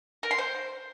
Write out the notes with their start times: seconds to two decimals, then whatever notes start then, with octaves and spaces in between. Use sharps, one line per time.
0.23 A#4
0.31 C6
0.38 C5